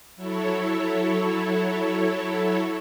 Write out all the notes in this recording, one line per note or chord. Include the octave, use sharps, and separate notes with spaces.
F#3 E4 A4 C#5